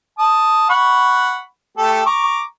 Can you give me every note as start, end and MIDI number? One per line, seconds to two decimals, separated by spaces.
0.19 0.67 81
0.19 0.67 87
0.70 1.41 78
0.70 1.41 83
0.70 1.41 85
1.78 2.01 57
1.78 2.01 67
1.78 2.01 69
2.06 2.42 82
2.06 2.42 85
2.06 2.42 86